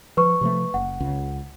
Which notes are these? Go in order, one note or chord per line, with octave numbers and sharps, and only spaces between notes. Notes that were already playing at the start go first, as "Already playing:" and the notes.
F3 B4 C#6
C3 F3 A3
F#1 F#5
C#2 C#3